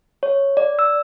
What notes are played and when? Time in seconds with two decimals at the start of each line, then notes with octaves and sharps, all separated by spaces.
0.23 C#5
0.57 D5
0.79 E6